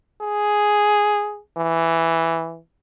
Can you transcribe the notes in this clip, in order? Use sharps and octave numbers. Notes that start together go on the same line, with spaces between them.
G#4
E3